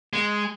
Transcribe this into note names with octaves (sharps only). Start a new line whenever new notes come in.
G#3